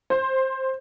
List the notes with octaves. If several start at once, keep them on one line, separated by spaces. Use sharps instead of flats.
C5